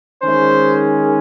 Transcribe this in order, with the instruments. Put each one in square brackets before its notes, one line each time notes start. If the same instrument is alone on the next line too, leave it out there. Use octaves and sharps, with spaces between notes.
[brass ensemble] D#3 G#3 C#4 C5